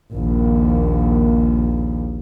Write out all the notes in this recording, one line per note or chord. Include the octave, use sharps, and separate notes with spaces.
A#1 D#2